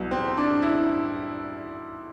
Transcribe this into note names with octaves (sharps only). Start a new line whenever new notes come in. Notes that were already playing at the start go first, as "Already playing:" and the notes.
Already playing: C2 B2 F#3
C4
D4
E4